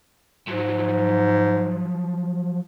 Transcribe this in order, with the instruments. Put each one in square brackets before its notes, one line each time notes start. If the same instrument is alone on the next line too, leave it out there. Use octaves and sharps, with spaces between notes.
[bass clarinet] G#2 [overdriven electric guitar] F3 F#3